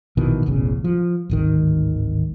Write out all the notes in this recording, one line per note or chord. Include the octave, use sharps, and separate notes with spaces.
A#1 B2 D#3 E3
E1 A1 E2 C#3
F3
D1 G#1 D#3